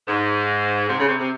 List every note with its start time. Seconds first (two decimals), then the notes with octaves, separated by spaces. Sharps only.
0.08 G#2
0.89 C3
0.99 C#3
1.09 C3
1.19 C3